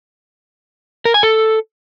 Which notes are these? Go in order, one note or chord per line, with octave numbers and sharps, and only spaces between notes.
A#4
G#5
A4